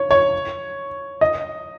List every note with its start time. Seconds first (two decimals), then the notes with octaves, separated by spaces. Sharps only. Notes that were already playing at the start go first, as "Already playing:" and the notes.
Already playing: C#5
0.11 C#5
1.21 D#5